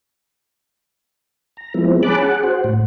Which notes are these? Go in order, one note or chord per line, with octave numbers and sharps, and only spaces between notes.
A#5
F3 G#3 B3 C4 E4
C#4 G#4 A5 B5 D6 F#6
G#4 F#5
F#4 C5
A2